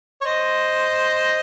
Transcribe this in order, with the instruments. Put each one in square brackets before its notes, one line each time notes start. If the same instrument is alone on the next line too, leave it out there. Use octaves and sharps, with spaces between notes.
[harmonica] C#5
C5 D#5